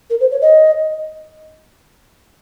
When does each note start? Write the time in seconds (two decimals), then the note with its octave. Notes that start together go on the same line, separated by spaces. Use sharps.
0.10 A#4
0.20 C5
0.31 C#5
0.42 D#5